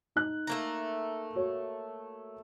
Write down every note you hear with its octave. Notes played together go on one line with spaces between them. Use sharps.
D#4 F#6
A3 A#3 A#5
F#4 C#5